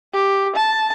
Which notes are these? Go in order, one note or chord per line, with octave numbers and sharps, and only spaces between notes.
G4
A5